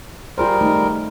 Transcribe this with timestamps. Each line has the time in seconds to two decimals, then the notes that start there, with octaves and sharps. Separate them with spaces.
0.38 G3 F4 G#4 A#4 C5
0.61 A3 D#4